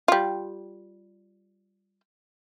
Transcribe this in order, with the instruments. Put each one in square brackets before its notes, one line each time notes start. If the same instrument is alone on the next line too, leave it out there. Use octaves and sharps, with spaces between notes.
[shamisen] G3 F4